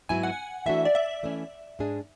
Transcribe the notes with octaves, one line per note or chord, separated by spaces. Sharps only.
G#2 F#3 B3 E4 G#5
F#5
E3 A3 D4 F#4 E5
D5
E5
E3 A3 C#4
G#2 G#3 D4 G#4